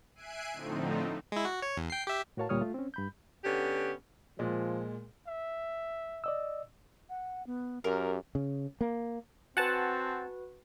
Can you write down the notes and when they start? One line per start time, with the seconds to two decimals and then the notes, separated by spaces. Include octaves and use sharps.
0.15 E5 G#5 F#6 C7 D7 D#7
0.53 A2 D3 F3 A3 C4 D#4
1.32 G#3 E4
1.45 F#4
1.62 C#5
1.77 E2
1.90 G5 C7
2.07 G4 E5
2.37 A2 F#4 A#4 C#5 F5 A5
2.49 D2 A#2 G3 C#5 D#6 F6
2.61 A3 F4
2.74 C4 C#4
2.94 G2 B5 G6
3.44 D3 B3 C#4 G4
4.39 A#2 F3 G#3
5.27 E5
6.24 D5 D#5 E6
7.09 F#5
7.47 B3
7.84 F#2 G4 A#4
8.35 C#3
8.81 A#3
9.57 C4 F#4 B4 F#5 G#5 A5